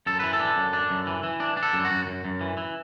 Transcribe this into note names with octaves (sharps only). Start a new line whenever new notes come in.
F#2 A4
E3 B4
A4
D4
F#2
D4
F#2
E3
E3
D4
D4
A4
F#2
F#4
F#2
F#2
F#2
E3
E3